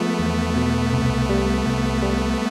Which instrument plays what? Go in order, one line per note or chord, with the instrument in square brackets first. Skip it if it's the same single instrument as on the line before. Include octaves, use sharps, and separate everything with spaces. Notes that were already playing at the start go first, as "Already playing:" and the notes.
Already playing: [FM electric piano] F3 G#3 [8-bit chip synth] A3 B3
[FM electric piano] E2
B2
C2
G3
C2
G3